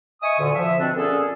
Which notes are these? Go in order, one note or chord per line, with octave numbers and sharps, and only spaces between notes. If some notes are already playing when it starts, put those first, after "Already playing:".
D#5 E5 G#5 C#6 D#6
D2 A#2 D3
F3 E5
B2 C4 D4
A#2 D3 C#4 G#4 A4